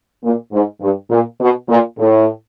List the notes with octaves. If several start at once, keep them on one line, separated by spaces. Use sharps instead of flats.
A#2
G#2
G2
A#2
B2
A#2
A2